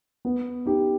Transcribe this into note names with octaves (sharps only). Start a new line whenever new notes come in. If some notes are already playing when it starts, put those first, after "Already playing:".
B3
D#4 G4